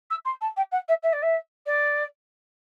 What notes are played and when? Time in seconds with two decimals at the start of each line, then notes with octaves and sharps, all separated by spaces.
0.10 E6
0.25 C6
0.41 A5
0.57 G5
0.72 F#5
0.88 E5
1.03 E5
1.13 D5
1.23 E5
1.66 D5